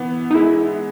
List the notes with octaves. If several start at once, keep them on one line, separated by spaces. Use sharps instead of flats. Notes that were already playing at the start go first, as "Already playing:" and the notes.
Already playing: E3 B3
D#4
G#3 E4